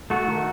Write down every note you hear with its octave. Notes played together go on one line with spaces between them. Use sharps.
A3 F#4
D#3